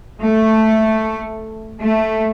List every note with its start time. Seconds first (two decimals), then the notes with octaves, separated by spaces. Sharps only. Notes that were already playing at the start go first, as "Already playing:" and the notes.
0.22 A3
1.81 A3